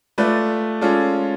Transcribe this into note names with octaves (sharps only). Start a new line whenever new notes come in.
A3 F4 B4 D5
G#3 C#4 F4 A4 D5